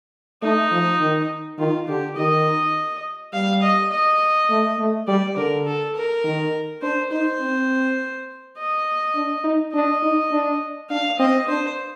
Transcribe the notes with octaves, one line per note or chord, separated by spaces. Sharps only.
A3 D#4
F3
D#3
D#3 F4
D3 G4
D#3 D#5
G3 F5
D#5
D#5
A3
A3
G3 D5
D3 A#4
A4
A#4
D#3
D4 C5
D#4 C5
C4
D#5
D4
D#4
D4 D#5
D#4
D4
D4 F5
C4 D#5
D4 C5